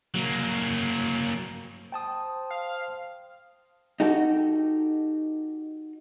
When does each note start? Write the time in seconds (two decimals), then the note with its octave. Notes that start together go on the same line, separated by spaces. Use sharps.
0.14 F#3 A#3
1.92 C5 G5 A5 D#6
2.51 F5
4.00 D#4 F#4 G4 A4